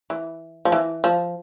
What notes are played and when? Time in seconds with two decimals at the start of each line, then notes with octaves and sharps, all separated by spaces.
0.10 E3
0.65 F3
0.72 E3
1.04 F3